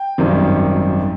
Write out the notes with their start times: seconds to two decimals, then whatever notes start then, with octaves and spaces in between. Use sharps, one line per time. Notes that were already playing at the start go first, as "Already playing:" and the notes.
Already playing: G5
0.18 G#1 F#2 D#3 G3